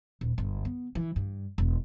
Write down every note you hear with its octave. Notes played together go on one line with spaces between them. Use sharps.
D#1
G1
B3
E3
G2
E1